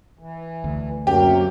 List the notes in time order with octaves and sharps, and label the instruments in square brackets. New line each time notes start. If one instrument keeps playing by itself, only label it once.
[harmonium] E3
[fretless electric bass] D2
[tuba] F#2 [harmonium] C3 F#3 A#3 [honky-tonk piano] G4